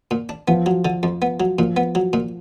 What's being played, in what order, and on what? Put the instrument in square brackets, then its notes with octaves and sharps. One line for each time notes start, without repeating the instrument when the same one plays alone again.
[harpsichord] A#2
D4
[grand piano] F3 [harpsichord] B3
[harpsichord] F#3
D3
F2
B3
F#3
[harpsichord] A#2 [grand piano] F3
[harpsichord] B3
F#3
A#2